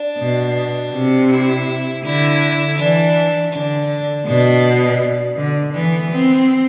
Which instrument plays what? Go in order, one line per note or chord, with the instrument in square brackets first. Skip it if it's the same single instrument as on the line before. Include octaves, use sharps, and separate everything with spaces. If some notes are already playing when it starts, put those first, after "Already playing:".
Already playing: [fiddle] D4
[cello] B2
C3
[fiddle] E4
[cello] D3 [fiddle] E4
[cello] E3 [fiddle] D4
[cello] D3 [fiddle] D4
[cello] B2 [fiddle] D4
[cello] D3
[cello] E3 [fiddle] B3
[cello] C4